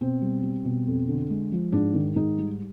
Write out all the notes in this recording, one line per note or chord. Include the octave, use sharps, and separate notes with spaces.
B2 C4
G3
G3
B2
F2
D3
G#3
F3
G#2 D4
D#3
G#2 D#4
G3